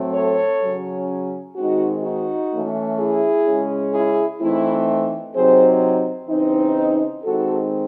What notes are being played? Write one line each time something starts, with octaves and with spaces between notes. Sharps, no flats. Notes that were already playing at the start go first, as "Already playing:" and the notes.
Already playing: A2 F#3 A3 C4
A4 C#5
C#3 F#3 C#4
D#3 G#3 C4 D#4 F#4
D#4 F#4
E3 A3 C#4
E4 G#4
C#3 G#3 C#4
E4 G#4
E3 A3 C4 D#4 E4
C3 F#3 C4 D#4 G#4 C5
C#3 E3 C4 D#4
D#3 G#3 C4 D#4 F#4 A4